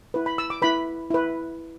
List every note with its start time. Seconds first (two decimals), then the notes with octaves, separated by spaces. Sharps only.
0.14 E4 B4
0.26 B5
0.38 E6
0.50 D6
0.62 E4 B4 B5
1.11 E4 B4